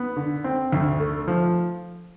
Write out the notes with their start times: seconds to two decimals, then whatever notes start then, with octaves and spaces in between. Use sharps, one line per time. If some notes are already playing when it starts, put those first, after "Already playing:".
Already playing: B3
0.17 D3
0.44 C4
0.72 D2
1.00 A3
1.28 F3